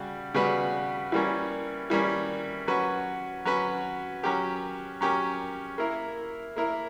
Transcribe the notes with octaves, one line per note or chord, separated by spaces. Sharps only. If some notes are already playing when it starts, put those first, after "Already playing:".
Already playing: C#3 G3 F#4
C#3 G3 B3 F#4 B4
E3 G3 A#3 C#4
E3 G3 A#3 C#4
F#3 C#4 F#4 B4
F#3 C#4 F#4 B4
F#3 C#4 G4 A#4
F#3 C#4 G4 A#4
A#3 E4 A#4
A#3 E4 A#4